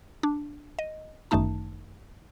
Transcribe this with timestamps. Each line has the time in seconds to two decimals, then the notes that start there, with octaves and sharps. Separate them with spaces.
0.23 D4
0.79 D#5
1.31 G1 F#2 D#3 A3 D#4 A5